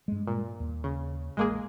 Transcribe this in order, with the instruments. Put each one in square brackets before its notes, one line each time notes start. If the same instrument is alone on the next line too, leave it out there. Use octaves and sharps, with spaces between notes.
[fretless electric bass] G2 G#3
[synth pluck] A#2
[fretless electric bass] D#2
[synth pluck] C#3
[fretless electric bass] A1 [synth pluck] G#3 A#3 G#4